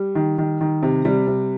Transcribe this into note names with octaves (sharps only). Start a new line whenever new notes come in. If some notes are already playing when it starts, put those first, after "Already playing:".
Already playing: G3
D#3
D#3
D#3
C3
C3 G3
C3